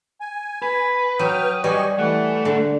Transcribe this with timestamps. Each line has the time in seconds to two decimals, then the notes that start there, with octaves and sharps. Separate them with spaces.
0.21 G#5
0.62 B4 B5
1.19 F#3 G5 D#6 F6
1.64 G3 G4 D#5 G#5 C#6
1.99 E3 A3 F#5
2.45 D3